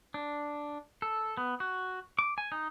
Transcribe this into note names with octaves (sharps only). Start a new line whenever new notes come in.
D4
A4
B3
F#4
D6
G#5
D#4